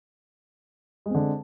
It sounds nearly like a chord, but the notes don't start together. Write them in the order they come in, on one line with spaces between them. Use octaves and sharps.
G#3 C4 D3